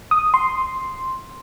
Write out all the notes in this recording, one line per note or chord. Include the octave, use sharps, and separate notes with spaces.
D#6
C6